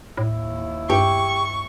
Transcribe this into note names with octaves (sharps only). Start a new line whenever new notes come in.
D#2 A2 E4
G2 G4 C#6